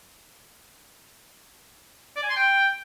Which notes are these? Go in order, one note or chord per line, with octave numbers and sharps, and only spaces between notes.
D5
G#5
C6
G5